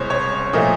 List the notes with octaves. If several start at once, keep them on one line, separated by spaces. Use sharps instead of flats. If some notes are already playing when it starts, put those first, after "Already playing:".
Already playing: C2 B2 G#3 C5 C#5
C#5
A#2 F3 A3 D#5